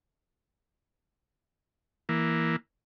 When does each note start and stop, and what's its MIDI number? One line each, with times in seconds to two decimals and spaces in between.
2.09 2.56 52
2.09 2.56 58